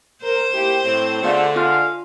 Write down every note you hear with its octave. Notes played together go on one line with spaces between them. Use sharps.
A#4 C5
A#3 E4 G4
A2 C4
D3 A3 F4 G#4 F5
G#3 F4 F5